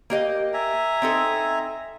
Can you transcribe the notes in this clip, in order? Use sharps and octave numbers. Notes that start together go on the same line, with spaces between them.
A#3 G4 D#5
E5 G#5 A#5
C4 D#4 A4